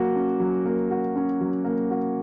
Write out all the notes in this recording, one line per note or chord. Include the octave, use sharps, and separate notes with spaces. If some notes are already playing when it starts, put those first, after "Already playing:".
Already playing: F#3 A#3 F#4
C#4
F#3
A#3
F#4
C#4
F#3
A#3
F#4